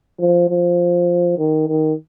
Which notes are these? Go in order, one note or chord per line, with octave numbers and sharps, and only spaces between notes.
F3
F3
D#3
D#3